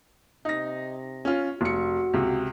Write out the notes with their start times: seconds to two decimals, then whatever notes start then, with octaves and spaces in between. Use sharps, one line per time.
0.45 C3 D#4 A#6
1.25 C#4 F4
1.61 F1 F#4 C#7
2.13 C#2 C3